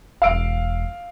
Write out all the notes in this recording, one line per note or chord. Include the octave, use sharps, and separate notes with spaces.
E1 F5 E6 D7